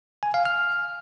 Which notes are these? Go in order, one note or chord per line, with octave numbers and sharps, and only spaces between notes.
G#5
F5
F6